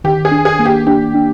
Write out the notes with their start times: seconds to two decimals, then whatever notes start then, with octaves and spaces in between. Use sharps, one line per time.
0.04 D#3 G4
0.25 G#4
0.31 D4
0.45 G#4
0.59 A#3
0.65 G4
0.87 D4 G4
1.15 D4